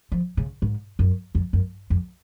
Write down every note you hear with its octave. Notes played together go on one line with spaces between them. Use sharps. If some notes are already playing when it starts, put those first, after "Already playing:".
F3
C#3
G#2
F#2
F2
F#2
F2